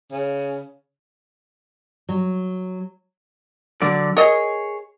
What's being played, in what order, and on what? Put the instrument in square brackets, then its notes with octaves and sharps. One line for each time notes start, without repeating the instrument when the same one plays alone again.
[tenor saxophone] C#3
[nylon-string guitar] F#3
[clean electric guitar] D3 F#3 D5
[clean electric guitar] G#4 C#5 [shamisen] A#4 D#5